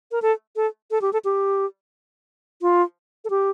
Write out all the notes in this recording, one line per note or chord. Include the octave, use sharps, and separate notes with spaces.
A#4
A4
A4
A4
G4
A4
G4
F4
A4
G4